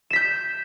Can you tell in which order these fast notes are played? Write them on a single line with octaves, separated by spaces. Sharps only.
E7 B6 G6